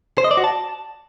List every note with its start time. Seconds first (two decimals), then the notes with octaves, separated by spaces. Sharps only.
0.18 C5
0.24 D#5
0.31 D5
0.37 F#4
0.44 A5